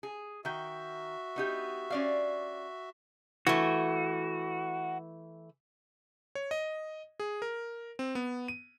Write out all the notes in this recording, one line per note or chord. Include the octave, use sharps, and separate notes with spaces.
G#4
D#3 F#4 E5 G5
B3 D#4 G4
C#4 D5 F5
E3 A3 F#4
C#5
D#5
G#4
A#4
C4
B3
D#7